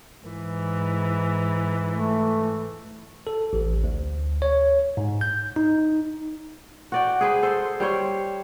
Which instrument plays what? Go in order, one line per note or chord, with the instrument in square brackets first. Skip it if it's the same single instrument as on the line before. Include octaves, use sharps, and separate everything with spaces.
[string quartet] G#2 E3
[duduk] A3
[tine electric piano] A4
A1
D2
C#5
G#2
G6
D#4
[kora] F#4 D5 G5
G#4 B4 C5
A4 C5
G3 C5 C#5